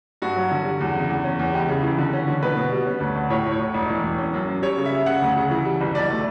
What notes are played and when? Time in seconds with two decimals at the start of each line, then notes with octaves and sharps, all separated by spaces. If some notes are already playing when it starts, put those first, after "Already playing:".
0.22 G2 F#4
0.36 F#3
0.51 D3
0.65 G3
0.80 E2
0.94 C#3
1.09 E2
1.24 C#4
1.39 E2
1.54 C#2 G4
1.69 C#3
1.83 E3
1.98 D3
2.13 C#4
2.28 D3
2.43 B2 B4
2.56 B2
2.72 G3
2.86 C#4
3.00 D2
3.15 D2
3.30 A2 C#5
3.45 A2
3.52 C#5
3.59 A2
3.74 E1
3.89 E3
4.03 E1
4.18 C#4
4.34 F#2
4.48 F#2
4.62 G3 C#5
4.77 C#3
4.85 E5
4.92 G3
5.06 C#3 F#5
5.22 D2
5.36 C#3
5.51 E3
5.65 G3
5.81 G1
5.95 B1 D5
6.10 A3